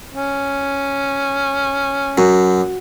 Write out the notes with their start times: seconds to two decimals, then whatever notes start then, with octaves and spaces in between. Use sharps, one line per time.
0.14 C#4
2.18 F#2 F#4